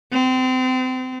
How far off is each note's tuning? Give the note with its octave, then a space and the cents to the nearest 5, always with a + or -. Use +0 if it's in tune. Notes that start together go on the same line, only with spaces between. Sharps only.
C4 -30